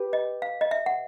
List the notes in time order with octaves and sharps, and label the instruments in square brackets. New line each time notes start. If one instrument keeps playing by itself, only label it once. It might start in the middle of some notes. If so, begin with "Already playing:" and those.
Already playing: [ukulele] G4 B4
[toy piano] D#5
F5
D#5
E5
F#5